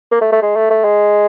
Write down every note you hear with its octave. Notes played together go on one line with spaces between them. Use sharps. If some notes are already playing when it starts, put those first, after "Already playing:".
A#3
A3
A3
G#3
A3
A3
G#3